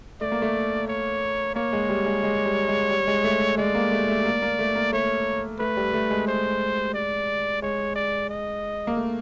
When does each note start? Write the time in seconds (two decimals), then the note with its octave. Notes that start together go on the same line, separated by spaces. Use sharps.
0.21 A3 D5
0.32 A#3
0.42 A3
0.88 C#5
1.55 A#3 C#5
1.73 G#3
1.89 G3
2.06 G#3
2.23 G#3
2.46 G3
2.68 G#3
2.91 G3
3.07 G#3
3.24 A3
3.58 G#3 D5
3.75 A#3
3.92 A3
4.08 A3
4.25 A#3
4.42 A#3
4.59 A3
4.75 A#3
4.93 A3 C#5
5.60 A3 B4
5.77 G3
5.94 A3
6.10 G#3
6.27 C5
6.94 D5
7.62 G#3 C#5
7.96 D5
8.30 D#5
8.87 A#3
8.97 A3